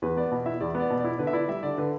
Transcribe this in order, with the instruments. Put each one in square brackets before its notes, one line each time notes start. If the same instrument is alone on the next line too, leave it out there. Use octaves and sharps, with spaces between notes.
[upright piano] E2 [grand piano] B4
[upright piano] B3 [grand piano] D5
[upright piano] B2
[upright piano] E4 [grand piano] E5
[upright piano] E2 [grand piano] D5
[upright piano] B3
[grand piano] D5
[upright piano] B2
[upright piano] E4 [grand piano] D5
[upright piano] D3 [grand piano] B4
[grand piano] E5
[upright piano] E4 [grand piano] D5
[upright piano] G3 [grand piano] E5
[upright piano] D3 [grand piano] D5
[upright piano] D3 [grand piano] B4